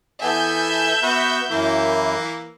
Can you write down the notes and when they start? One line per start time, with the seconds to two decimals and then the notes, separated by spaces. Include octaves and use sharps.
0.22 E3 B3 A4 E5 G#5 G6
1.03 B3 F#4 B4
1.51 F#2 E3 A#3 E4